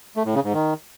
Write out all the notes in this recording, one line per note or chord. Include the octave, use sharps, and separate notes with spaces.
A3
A2
C#3
G#2
D#3